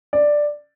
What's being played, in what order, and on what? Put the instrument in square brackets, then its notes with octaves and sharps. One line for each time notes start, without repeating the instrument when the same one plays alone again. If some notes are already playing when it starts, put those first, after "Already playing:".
[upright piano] D5